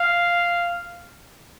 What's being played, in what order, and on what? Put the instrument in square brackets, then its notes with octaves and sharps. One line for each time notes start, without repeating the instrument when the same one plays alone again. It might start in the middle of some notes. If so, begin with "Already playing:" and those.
Already playing: [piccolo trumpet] F5